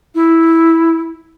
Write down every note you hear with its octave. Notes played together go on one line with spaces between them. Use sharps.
E4